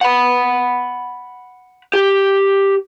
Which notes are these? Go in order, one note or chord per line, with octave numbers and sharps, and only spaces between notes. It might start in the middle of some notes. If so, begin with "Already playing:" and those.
F#5 B5
G4